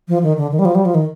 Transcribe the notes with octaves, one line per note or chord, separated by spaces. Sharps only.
F3
D#3
D3
D#3
G3
F3
G3
F3
D#3